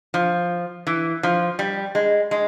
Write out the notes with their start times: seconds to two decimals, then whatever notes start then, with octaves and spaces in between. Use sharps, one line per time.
0.14 F3
0.87 E3
1.23 F3
1.59 G3
1.95 G#3
2.31 G#3